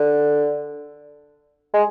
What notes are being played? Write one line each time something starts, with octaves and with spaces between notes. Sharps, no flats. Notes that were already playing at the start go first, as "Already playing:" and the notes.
Already playing: D3
G#3